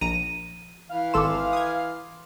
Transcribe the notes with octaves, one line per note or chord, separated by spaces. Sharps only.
A#1 A#5 A#6 D#7
E3 F5
G#1 A4 C6 D6 E7
D#6 G#6